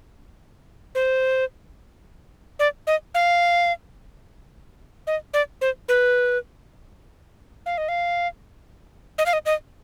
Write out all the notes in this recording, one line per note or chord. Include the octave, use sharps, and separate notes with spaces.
C5
D5
D#5
F5
D#5
D5
C5
B4
F5
D#5
F5
D#5
F5
D#5
D#5